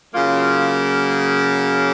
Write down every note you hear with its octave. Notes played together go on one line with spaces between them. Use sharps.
C#3 F#3 A#3 F4